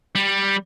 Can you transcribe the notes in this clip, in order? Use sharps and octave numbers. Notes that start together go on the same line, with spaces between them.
G3